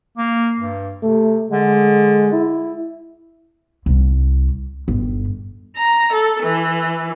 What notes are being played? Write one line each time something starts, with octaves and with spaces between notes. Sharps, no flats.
A#3
G2
C3 A3
D3 G#3
E4
C2 G3
G1
A#5
A4
E3